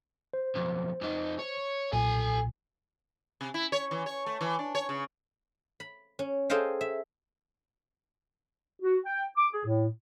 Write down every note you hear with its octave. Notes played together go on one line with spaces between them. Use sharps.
C5
B1 F2
F2 D#4
C#5
B1 A#2 A4 G#5
C3
E4
C#5
E3
C#5
A3
E3
D4
C#5
C#3
B5
C#4
G#4 A4 C5 D#5 F5 G5
E5
F#4
G5
D6
G#4
A2